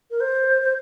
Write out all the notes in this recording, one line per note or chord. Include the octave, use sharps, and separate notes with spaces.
A#4
C5
C5